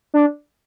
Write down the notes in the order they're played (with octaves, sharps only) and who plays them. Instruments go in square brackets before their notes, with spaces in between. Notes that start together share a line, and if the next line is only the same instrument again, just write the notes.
[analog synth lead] D4